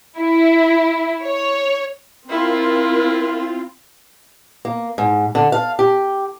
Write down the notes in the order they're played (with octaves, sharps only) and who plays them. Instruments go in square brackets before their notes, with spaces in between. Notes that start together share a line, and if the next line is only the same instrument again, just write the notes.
[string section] E4
C#5
[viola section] C4 F4 [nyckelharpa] E4 [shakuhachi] A#4
[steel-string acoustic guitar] A#3
G#2
D3
F5
G4